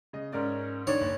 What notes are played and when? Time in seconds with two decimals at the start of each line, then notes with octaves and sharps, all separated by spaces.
0.13 C#3 D#5
0.33 G#2 C#4 A#4 D5
0.87 D#3 D4 C#5
1.01 F#1